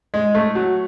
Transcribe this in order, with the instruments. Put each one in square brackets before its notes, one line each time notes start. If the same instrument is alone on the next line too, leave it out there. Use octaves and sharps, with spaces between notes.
[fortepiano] G#3
A3
F#3